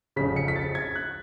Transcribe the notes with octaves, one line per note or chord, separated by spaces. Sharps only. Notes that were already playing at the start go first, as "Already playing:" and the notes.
F1 F2 C#3 B6
C#7
B6
A6
G#6
F#6